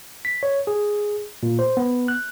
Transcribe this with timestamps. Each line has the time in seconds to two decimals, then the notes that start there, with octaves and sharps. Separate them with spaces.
0.25 B6
0.43 C#5
0.67 G#4
1.43 A#2
1.59 C5
1.77 B3
2.08 F#6